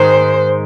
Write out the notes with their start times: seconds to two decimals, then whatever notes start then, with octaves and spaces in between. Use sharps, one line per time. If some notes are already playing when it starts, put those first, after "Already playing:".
Already playing: G#2 D#3 G#3 C5